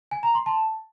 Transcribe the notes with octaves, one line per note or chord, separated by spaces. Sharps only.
G#5
A#5
C6
A5